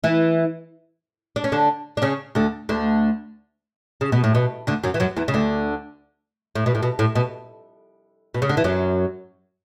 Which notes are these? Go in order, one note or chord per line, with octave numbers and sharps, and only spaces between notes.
E3 E4
D4
C#4
D3 D4
D4
C#3 C#4
D2 D3
D2 D3
C#3
B2
A2
B2
D2 D3
F#2 F#3
E3
F#2 F#3
E2 E3
C#3
D2 D3
A2
B2
A2
B2
A2
B2
B2
C#3
D3
E3
F#2 F#3